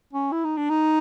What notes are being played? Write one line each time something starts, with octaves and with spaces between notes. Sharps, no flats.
C#4
E4
D#4
D4
D#4